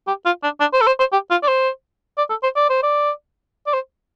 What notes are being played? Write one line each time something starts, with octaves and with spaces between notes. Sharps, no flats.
G4
F4
D4
D4
C5
A4
C5
C5
G4
F4
D5
C5
D5
A4
C5
D5
C5
D5
D5
C5